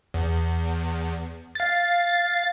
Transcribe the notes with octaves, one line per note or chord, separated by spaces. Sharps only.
E2
F5 A6